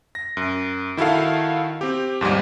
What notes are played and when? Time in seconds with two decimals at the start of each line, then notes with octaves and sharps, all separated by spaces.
0.15 A#6
0.37 F#2
0.97 D#3 E4 F#4 A4 F5
1.81 C4 G4
2.21 D#2 G#2 F3 G3